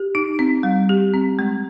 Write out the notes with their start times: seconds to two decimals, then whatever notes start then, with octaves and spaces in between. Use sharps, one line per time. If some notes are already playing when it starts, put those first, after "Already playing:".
Already playing: G4
0.15 D#4
0.39 C4
0.63 G3
0.89 G4
1.14 C4
1.39 G#3